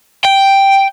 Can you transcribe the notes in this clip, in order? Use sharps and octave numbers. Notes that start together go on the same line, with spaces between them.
G5